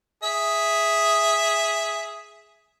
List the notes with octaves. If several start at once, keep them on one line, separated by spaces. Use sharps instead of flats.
G#4 E5